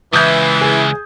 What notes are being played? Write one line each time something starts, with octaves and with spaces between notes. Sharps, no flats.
C#2 E3 D#6 G6 G#6
G#4